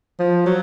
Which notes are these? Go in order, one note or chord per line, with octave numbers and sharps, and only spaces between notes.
F3
F#3